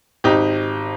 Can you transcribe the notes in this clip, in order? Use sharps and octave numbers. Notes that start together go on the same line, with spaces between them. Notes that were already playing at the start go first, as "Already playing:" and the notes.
G#1 D#4 G4